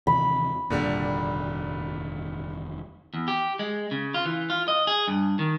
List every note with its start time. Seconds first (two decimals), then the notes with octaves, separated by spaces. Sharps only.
0.07 D#2 C3 E3 B5
0.70 F1 D#2 A#2 D3 G3 D4
3.14 E2
3.28 G4
3.59 G#3
3.91 C#3
4.14 F4
4.26 E3
4.50 F4
4.68 D#5
4.87 G#4
5.08 G2
5.39 D#3